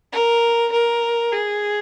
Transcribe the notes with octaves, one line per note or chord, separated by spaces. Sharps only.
A#4
A#4
G#4